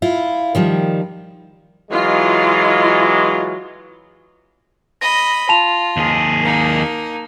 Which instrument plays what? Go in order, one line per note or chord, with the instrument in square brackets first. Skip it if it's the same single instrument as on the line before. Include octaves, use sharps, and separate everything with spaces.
[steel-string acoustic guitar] E4 F4
D#3 F3 G3
[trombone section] E3 F#3 G#3 [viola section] F4 D#5
[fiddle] D#5 B5 [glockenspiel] A#6
[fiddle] F4 [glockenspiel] A5 F7
[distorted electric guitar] D#2 G#4
[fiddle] A#3 D#4